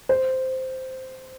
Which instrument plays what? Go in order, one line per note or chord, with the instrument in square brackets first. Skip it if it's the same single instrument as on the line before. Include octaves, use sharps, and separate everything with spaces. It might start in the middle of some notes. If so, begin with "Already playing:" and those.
[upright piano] C5